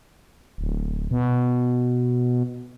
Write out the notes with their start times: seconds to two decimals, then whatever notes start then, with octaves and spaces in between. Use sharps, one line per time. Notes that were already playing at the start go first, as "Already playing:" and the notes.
0.58 D1
1.11 B2